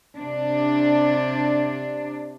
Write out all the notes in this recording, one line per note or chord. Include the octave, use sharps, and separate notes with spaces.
C3 D4